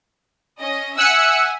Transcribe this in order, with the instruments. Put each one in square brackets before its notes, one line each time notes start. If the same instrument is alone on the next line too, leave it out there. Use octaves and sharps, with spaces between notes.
[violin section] C#4 D#5
[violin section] E5 F#5 G#5 [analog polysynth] E6 F#6 C#7